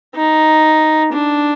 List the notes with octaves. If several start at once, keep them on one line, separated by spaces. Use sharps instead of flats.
D#4
D4